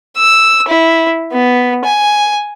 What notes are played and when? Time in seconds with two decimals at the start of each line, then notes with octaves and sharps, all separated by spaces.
0.17 E6
0.68 E4
1.32 B3
1.85 G#5